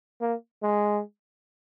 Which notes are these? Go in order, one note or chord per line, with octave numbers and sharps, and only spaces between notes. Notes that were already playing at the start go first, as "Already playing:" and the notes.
A#3
G#3